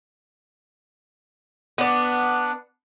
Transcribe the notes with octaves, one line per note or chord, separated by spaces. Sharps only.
B3 D4